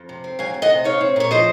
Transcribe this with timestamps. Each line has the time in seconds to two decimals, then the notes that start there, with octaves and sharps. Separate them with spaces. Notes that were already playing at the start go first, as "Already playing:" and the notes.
Already playing: F2
0.09 C3
0.24 C4
0.39 F#3 F5 G#5
0.54 F2
0.62 D#5 F#5
0.70 C3
0.84 D#4 C#5 F5
1.01 C4
1.16 A#2 C#5
1.31 F3 C5 D#5